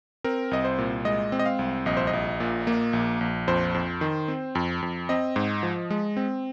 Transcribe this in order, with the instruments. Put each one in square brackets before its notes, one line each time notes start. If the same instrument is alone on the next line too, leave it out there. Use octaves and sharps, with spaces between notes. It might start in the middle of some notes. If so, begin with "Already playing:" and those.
[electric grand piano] C4 A#4
C2 D#5
C5
A#2
G#3 D#5
C4
D#5
F5
C2
A#1 D#5
C5
D#5
A#1
A#2
A#3
A#1
A#1
F2 C5
F2
D#3
C4
F2
F2
C4 D#5
G#2
F3
G#3
C4